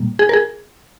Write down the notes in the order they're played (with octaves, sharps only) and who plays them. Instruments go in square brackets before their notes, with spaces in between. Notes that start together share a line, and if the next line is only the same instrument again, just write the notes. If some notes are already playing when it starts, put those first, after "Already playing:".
Already playing: [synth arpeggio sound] A#2 G3 A#3
G#4
A#4
G#4